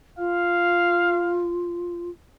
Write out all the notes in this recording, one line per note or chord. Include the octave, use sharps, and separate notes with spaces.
F4 F5